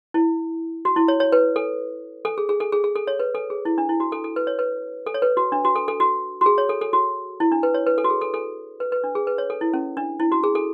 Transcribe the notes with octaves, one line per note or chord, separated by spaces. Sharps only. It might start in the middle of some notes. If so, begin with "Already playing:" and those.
E4
F#4
E4
C#5
C#5
B4
A4
A4
G#4
G#4
A4
G#4
G#4
A4
C#5
B4
A4
G#4
E4
D4
E4
F#4
A4
A4
B4
C#5
B4
A4
C#5
B4
F#4
D4
F#4
A4
A4
F#4
F#4
G#4
C#5
A4
A4
F#4
E4
D4
B4
C#5
B4
A4
F#4
G#4
A4
A4
B4
B4
D4
G#4
B4
C#5
A4
E4
C#4
D4
E4
F#4
G#4
A4